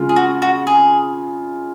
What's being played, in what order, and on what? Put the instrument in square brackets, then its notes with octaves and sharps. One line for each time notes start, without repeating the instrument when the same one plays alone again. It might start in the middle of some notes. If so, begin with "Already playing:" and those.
Already playing: [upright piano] C#3 G#3 F4
[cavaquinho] G#4
F#4
F#4
G#4